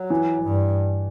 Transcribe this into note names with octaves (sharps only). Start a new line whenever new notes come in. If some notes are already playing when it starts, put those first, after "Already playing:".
Already playing: F#3
E3
G2